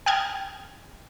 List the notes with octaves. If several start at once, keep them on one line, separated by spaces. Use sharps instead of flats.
G5 D#6 F6 G#6